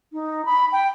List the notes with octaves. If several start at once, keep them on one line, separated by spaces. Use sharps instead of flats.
D#4
B5
G5